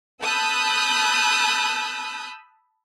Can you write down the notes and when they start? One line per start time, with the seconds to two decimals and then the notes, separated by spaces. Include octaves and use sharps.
0.22 A5 B5 D#6 E6 F#6 G6